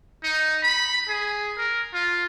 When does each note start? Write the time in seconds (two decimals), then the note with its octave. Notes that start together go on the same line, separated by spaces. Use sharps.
0.23 D#4
0.63 B5
1.09 G#4
1.58 A#4
1.94 F4